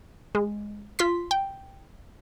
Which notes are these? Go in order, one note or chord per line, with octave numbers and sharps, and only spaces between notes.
G#3
F4 C6 B6
G5